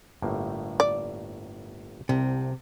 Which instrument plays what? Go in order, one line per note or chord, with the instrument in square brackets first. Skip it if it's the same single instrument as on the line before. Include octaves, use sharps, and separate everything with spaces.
[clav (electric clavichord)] G1 A2 A#3
[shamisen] D5
[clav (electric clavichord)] C2 [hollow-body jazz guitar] C3